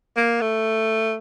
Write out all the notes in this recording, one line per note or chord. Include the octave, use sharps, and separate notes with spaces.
A#3
A3